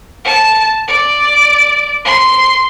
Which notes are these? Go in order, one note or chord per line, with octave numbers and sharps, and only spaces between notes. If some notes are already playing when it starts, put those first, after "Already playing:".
A5
D5
C6